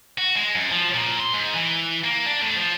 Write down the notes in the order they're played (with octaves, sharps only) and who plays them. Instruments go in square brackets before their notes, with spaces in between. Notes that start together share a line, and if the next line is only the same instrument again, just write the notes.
[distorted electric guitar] F#4
G#3
F#2
F3
A#2
C6
G#2
E3
A#3
D4
A2
F3